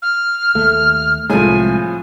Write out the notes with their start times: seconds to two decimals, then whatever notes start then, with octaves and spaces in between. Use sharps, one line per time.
0.02 F6
0.55 D#2 A3
1.30 C2 A2 F3 G#3 G#5